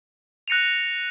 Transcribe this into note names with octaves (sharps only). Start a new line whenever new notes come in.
F#6 A#6 C#7 D#7 F7